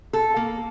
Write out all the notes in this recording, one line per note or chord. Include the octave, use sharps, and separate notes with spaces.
A4
A#3